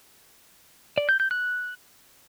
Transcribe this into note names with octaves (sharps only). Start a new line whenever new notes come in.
D5
G6
G6
F#6